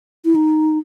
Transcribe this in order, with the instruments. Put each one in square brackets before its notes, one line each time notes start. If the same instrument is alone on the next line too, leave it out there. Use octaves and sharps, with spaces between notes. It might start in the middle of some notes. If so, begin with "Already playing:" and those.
[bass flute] E4
D#4